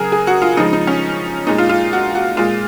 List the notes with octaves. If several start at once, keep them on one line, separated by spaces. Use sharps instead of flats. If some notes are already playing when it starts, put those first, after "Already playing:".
Already playing: C#3 F#3 G#4 A#4
G#4
F#4
F4
C#3 F3 G#3 D#4
D#4
C#4
A#2 G#3 D#4
F4
F4
F#4
F#4
A#2 G#3 F4